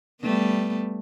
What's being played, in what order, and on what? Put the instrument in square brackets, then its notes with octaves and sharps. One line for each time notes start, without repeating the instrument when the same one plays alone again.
[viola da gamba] G3 A3 B3